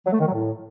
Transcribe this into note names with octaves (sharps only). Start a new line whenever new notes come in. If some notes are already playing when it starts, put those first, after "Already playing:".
F#3
A3
D#3
F#3
A2